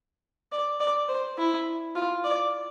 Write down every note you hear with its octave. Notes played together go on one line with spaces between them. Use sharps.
D5
D5
C5
E4
F4
D5